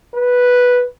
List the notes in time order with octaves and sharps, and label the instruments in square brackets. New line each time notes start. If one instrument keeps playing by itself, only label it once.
[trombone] B4